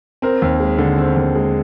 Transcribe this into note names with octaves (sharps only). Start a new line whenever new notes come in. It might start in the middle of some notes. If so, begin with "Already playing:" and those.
C4 A#4
D#2
G#3
D3
C4
D#2
G#3